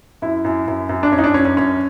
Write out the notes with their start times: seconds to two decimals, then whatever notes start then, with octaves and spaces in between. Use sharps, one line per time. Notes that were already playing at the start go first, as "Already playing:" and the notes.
0.22 F#2 E4
0.44 F#2
0.68 F#2
0.89 F#2
1.03 D4
1.12 F#2 C#4
1.19 D#4
1.24 D4
1.34 F#2 C#4
1.45 C#4
1.57 F#2 C#4